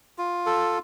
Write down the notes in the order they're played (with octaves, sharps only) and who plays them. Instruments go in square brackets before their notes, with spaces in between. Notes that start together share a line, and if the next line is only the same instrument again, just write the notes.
[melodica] F4
A4